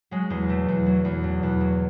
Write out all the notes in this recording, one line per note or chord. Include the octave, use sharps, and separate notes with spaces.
F#3 G#3
E2 G#3
B2 A3
E2
F#3
E2
B2
E2
F#3